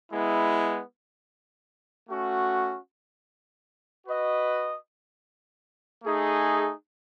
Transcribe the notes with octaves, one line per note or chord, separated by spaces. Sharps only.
G#3 B3 E4
A3 C#4 F#4
F#4 B4 D#5
A3 D#4 G#4